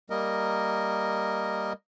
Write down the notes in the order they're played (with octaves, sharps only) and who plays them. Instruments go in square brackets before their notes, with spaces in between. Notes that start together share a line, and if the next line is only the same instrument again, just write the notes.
[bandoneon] G3 A#3 A#4 D#5